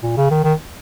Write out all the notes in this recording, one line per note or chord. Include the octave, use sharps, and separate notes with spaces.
A#2
C#3
D#3
D#3